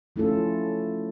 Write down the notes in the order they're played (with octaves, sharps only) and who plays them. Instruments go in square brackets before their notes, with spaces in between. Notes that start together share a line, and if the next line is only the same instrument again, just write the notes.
[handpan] F3 A3 C#4 E4 F4 A4